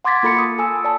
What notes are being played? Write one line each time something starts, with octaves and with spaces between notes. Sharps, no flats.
F#5 C6 D6 G#6 A6 B6
A#3 F4 A4 B5 A6 C#7
D#6
A4 G#5 E6
D5 A5